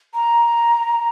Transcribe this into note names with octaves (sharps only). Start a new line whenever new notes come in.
A#5